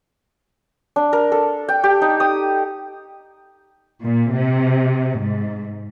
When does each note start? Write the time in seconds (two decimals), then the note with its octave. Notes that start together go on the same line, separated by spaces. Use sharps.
0.96 D4
1.13 A#4
1.32 A4
1.69 G5
1.84 G4
2.01 D#4
2.20 D#6
4.03 A#2
4.35 C3
5.20 G#2